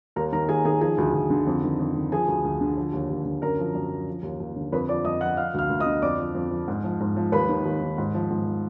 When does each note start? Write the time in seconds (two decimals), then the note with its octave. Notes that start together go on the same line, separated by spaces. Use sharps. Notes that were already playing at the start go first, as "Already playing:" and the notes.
0.16 D#2 A#4 A#5
0.32 D#3 A#4 A#5
0.49 D#2 G#4 G#5
0.65 D#3 G#4 G#5
0.81 F3 G#4 G#5
0.98 D2
1.14 D2
1.30 D3
1.47 F2
1.63 D#3
1.79 F2
1.95 D#3
2.12 F3 G#4 G#5
2.28 D2
2.44 D2
2.61 D3
2.77 F3
2.93 D#2
3.10 D#2
3.25 D3
3.42 F#2 A#4 A#5
3.59 F3
3.75 F#2
3.90 F3
4.08 F3
4.23 D#2
4.40 D#2
4.56 D3
4.72 F2 B4 B5
4.89 F3 D5 D6
5.05 F2 D#5 D#6
5.21 F3 F#5 F#6
5.37 F3 F5 F6
5.54 D2 F5 F6
5.70 D2
5.80 D#5 D#6
5.86 D3
6.02 F2 D5 D6
6.19 F3
6.35 F2
6.51 F3
6.68 G#2
6.84 F3
7.00 G#2
7.16 F3
7.32 D#2 B4 B5
7.49 D#3
7.65 D#2
7.81 D#3
7.98 G#2
8.14 F3
8.31 G#2
8.47 F3